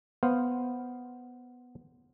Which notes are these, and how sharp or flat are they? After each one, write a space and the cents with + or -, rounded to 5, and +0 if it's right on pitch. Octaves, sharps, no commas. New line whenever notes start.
B3 +0 C5 +0 F5 +5